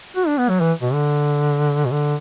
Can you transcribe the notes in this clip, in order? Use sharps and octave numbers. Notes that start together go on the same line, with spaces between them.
F#4
D4
B3
F#3
E3
B2
D3
B2
D3